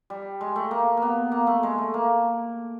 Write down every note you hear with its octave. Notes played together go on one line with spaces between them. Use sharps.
G3
G#3
A3
A#3
A#3 B3
A#3
A3
G#3
A3
A#3